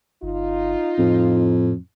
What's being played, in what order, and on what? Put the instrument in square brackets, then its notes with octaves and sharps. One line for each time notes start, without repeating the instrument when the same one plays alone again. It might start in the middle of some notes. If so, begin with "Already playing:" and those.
[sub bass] G1 [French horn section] D#4 F4
[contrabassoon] F2 [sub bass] A2